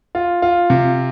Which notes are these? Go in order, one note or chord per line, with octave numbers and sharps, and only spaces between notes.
F4
F4
C3